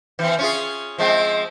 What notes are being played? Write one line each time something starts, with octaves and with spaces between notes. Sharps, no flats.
E3 C4
C#4 F4 G#4
F3 G#3 C4